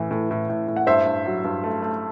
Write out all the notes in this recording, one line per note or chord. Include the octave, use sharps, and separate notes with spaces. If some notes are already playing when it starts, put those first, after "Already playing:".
Already playing: A2 E3
A2
A2
A2
A2
F#5
G2 C5 E5
G2
F#3
G2
A3
A3